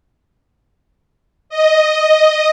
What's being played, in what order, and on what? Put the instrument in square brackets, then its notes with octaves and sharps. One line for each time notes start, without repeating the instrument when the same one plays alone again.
[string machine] D#5